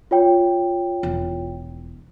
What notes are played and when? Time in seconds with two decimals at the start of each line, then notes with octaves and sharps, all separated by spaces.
0.11 F4 C#5 G5
1.03 E1